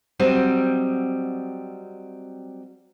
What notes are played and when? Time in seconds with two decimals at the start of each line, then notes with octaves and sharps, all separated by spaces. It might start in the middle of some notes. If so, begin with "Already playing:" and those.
0.19 F#3 G3 C4 D#5